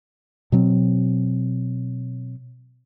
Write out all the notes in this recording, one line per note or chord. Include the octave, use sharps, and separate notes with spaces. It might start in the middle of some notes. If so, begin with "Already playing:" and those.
B2 F#3 C4